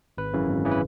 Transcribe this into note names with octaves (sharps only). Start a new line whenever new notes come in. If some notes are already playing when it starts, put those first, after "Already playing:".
G#1 B4
F#2 C#3 E3
G#1
C#3 E3
B4